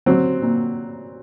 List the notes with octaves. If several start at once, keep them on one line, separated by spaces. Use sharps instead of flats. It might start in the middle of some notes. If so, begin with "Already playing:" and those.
F#3 C4
A#2